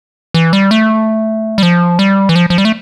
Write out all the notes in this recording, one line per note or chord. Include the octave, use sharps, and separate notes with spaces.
E3
G3
A3
G3
F3
G3
E3
F3
F3
G3
A3